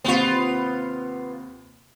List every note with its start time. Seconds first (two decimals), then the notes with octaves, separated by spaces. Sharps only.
0.04 D#2 C3 B3 C4 F4